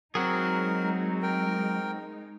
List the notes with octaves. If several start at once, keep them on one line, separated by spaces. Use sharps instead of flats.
F#3 G#3 C4 D#4 F#4 G#4 A#4
A#4 G5